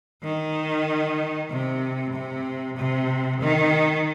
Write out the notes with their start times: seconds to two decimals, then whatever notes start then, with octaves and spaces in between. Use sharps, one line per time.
0.24 D#3
1.50 C3
2.13 C3
2.77 C3
3.41 D#3